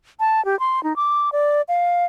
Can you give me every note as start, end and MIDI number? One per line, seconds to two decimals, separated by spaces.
0.20 0.44 81
0.45 0.58 67
0.60 0.83 84
0.83 0.96 63
0.96 1.30 86
1.32 1.62 74
1.68 2.06 77